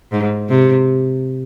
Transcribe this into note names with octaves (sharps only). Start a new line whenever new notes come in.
G#2
C3